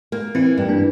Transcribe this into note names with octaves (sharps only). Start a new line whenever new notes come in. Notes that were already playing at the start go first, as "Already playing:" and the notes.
A#3
E3 C4 E4
G2
A#3 D4